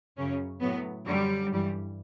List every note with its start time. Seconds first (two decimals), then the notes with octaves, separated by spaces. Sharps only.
0.17 F#2 C#3 F#3 C#4
0.62 A2 F#3 B3
1.06 F#2 D3 F#3 G3
1.50 G2 E3 G3